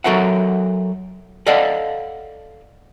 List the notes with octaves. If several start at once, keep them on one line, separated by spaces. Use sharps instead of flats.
F#3 F#4 A4 A#4 E5 F#5
A4 D5 D#5 F5 F#5 A5